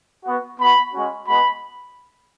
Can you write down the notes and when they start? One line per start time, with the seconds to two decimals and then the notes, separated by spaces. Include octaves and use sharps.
0.25 B3 F#4
0.59 B3 F#4 B5
0.93 G#3 C#4 F#4
1.27 G#3 B3 F#4 B5